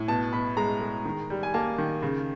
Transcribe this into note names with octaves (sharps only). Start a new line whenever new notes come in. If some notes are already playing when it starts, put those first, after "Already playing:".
Already playing: A2
B2 A5
B2 B5
G#3 A#5
G#3
D#3
G3
G#5
A#3 A5
D#3
C#3